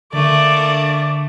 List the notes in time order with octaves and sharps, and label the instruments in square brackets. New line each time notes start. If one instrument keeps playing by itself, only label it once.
[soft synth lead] D3 [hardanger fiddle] A3 A#3 [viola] D5